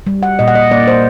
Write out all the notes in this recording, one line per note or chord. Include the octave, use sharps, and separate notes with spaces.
G3
F#5
A#2 D#5
F#5
D#5
A#3 D5
C5